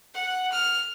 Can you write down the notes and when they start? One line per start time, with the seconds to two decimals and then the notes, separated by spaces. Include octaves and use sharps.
0.14 F#5
0.52 F6